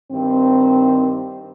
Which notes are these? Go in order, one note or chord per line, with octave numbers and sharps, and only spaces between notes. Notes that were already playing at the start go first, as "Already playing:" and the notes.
G2 D#3 C4